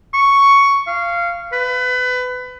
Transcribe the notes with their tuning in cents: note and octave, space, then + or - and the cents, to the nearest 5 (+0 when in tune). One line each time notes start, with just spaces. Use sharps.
C#6 +5
F5 -15
B4 +25